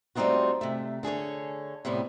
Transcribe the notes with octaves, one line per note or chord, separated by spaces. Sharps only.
G3 A3 C4 D#4 F4 F#4
C3 A3
D3 G#4 A4 C#5
A2 C3 G3 B3